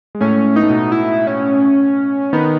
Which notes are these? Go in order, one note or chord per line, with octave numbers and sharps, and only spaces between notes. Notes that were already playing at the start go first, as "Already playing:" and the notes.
G#3
A2 A3 C#4
B3 D#4
A3
B2 B3
E4
C#4
D#3 B3 D#4